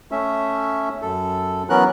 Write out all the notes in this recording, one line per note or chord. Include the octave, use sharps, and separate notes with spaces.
A3 C#4 E5
F#2 A4
E3 F#3 B3 C#4 A#4 F#6